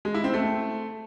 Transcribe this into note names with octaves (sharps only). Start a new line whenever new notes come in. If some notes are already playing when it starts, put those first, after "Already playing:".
G#3
E4
C4
A3